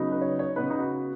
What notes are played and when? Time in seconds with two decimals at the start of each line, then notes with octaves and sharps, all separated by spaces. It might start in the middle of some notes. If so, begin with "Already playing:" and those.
Already playing: C#3 F#3 B3 D#4
0.12 B4
0.21 C#5
0.39 C#5
0.56 C#3 B3 D#4 B4
0.70 D#4
0.78 F#4